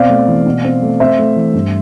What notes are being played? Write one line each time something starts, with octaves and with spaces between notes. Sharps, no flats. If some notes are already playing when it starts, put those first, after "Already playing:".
Already playing: B2 C4 D5 F5
A3
E3
B2
C4
A3
C4 C5 E5
A3
E3
G2